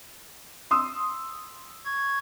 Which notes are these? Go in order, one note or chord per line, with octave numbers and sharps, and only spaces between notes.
C6 D#6 E6
C#6 G#6